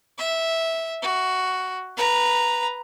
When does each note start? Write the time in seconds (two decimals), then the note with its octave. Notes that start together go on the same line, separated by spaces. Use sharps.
0.18 E5
1.02 F#4
1.97 B4 A#5